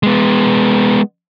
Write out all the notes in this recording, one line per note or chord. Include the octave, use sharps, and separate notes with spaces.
G#3 B3